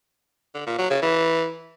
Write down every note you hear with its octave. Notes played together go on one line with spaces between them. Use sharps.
D3
A#2
F#3
C#3
E3